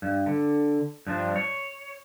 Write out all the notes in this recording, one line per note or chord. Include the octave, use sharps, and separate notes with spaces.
G2
D3
G2 F3 D4
C#5